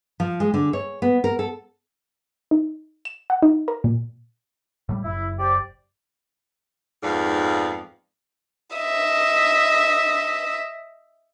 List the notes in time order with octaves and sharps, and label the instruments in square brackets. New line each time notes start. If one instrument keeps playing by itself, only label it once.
[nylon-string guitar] F3
G#3
D3
C#5
B3
A#4
A4
[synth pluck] D#4
E7
F#5
D#4
A#4
A#2
[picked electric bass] A2 F#3 G3
[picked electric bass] F#1 [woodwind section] E4
[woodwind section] G4 C5 D5
[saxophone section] F2 G#2 B3 D5 F5
[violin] D#5 E5